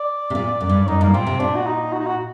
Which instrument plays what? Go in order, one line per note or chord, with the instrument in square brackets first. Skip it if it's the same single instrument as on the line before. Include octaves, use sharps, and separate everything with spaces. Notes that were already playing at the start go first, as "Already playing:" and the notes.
Already playing: [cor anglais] D5
[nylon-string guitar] C3
A#2
F#2
G2
[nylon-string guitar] F#2 [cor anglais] D#4
[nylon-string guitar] G2 [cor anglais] A#3
[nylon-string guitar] A#2 [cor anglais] C4
[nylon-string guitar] C3
[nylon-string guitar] A#2 [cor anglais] D4
[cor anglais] F#4
D#4
F#4
D#4
F#4